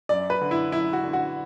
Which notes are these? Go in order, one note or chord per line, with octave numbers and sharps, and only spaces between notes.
F#2 D5
B4
D3
E4
F#2 E4
F#4
D3
F#4